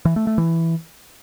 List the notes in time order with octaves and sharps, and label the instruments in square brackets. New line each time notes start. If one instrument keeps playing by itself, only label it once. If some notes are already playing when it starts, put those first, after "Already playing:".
[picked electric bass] E3
A3
A3
E3